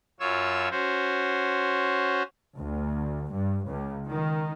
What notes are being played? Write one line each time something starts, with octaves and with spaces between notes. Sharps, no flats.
F#2 F4 C#5 E6
C#4 F#4 C5
D2
G2
C#2
D#3